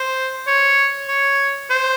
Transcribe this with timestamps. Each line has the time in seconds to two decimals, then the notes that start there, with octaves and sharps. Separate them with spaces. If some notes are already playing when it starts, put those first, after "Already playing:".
Already playing: C5
0.47 C#5
1.08 C#5
1.70 C5